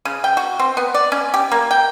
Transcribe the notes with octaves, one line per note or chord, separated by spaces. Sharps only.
C#3
G5
F#4
C4
B3
D5
C#4
G4
A#3
G5